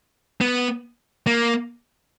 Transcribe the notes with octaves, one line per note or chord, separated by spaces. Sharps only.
B3
A#3